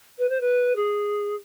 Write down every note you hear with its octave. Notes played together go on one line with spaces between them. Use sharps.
B4
C5
B4
G#4